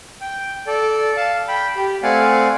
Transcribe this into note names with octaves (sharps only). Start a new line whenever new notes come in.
G5
A4 D5
F5 A5
G5 B5
G4
A3 C4 D5 F5 F#5 G#5